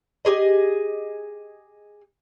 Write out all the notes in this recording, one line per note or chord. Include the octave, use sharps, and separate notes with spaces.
G4 G#4 D#5